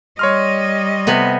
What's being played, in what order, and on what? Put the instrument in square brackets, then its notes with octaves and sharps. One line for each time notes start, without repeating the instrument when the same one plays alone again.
[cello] G3 D#5 [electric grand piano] C#5 C6 F6
[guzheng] C3 B3 B4